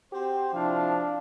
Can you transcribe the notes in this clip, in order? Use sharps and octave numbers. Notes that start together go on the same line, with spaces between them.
C4 F#4 G4 C5
C3 F3 D4 E4 F5